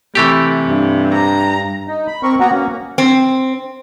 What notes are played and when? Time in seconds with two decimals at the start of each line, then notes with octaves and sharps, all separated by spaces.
0.15 C3 E3 A3 G4
0.66 G2
1.13 A#5
1.87 D#4
2.07 B5
2.23 C4 A#4 C#6
2.40 A#3 B3 F#4 F#5 A#5
2.52 A#3 C#4
2.98 C4